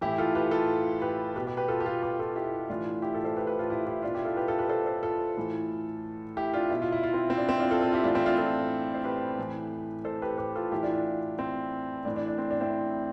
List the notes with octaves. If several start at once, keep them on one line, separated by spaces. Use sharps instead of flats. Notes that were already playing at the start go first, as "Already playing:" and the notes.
A2 E3 E4 G4
F4 A4
G4 B4
F4 A4
G4 B4
B2 G4 B4
G4 B4
G4 B4
F4 A4
G4
F4 A4
G4 B4
F4 A4
E4 G4
A2 E3 D4 F4
E4 G4
F4 A4
A4 C5
G4 B4
G4 B4
F4 A4
E4 G4
E4 G4
B2 D4 F4
E4 G4
F4 A4
G4 B4
F4 A4
G4 B4
A4 C5
A4 C5
F4 A4
A2 E3
E4 G4
D4 F4
B2 E4
F4
E4
F4
C4 E4
C4
D4
C4 E4
D4 F4
F4 A4
F4 A4
E4 G4
A2 E3 D4 F4
C4 E4
D4 F4
F4 A4
C5
G4 B4
A2 E3
A4 C5
G4 B4
G4 B4
F4 A4
A2 E3 E4 G4
D4 F4
D4
C4
A2 E3 D4
D4
D4
C4
D4
C4 E4